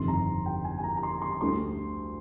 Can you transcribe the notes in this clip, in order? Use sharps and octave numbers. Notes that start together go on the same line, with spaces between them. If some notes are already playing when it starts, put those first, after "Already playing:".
Already playing: G1 F2 C3 D#3 C6
A#5
G5
G#5
G#5
A#5
A#5
C6
C6
D2 D3 G3 C6